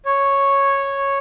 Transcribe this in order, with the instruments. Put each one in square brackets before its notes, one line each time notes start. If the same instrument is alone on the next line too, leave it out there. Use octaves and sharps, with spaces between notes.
[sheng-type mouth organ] C#5